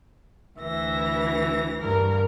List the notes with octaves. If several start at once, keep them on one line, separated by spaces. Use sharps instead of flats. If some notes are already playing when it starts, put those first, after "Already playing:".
D2 E3 E5 A#6
G2 A#4